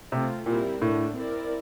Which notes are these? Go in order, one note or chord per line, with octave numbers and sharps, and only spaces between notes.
C3 A3 C4 F4
A#2 G3 C4 E4 A#4
A2 D3 A3 D4
C4 E4 A#4 D5